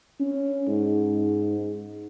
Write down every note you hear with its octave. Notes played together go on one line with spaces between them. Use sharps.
C#4
G#2